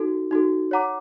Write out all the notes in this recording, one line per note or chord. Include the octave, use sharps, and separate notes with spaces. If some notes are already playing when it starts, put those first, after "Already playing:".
Already playing: D#4 F#4 A4
D#4 F#4 A4
C#5 F#5 A#5 D6